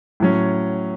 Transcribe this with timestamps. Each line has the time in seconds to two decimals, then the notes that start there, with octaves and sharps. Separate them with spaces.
0.20 A2 F#3 C#4